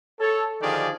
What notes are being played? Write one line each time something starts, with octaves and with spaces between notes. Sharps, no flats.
A4 C#5
D3 D#3 F3 G4 G#4 D5